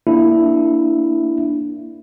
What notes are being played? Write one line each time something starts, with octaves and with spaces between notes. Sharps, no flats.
A#3 D4 E4